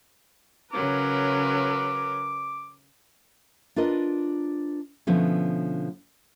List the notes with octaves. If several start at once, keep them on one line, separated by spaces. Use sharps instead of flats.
C#3 F#3 A#4 B4 D6
D4 F4 A#4 B4 D#5
B2 D3 F3 A3 B3 C#4